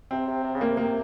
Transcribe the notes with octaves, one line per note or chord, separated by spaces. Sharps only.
C3 C4
C3
C3
C#3
C3 A#3
A#3